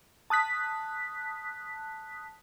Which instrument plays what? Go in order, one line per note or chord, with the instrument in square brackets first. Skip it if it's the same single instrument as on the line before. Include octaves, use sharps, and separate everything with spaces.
[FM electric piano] A5 D#6 F#6 B6